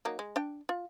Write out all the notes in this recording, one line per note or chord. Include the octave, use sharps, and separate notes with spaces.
F#3 A#3 D#4
G#3
D4 G5
F4